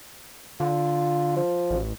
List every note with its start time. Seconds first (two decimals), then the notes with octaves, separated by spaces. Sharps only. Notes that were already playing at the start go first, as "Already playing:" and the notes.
0.60 D3 F4
1.37 F3
1.70 A1